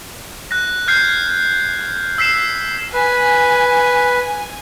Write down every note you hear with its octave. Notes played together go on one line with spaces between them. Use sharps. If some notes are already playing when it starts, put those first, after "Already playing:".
F#6 A#6
F6 G6 G#6 C7
E6 B6 C7 E7
B4 G#5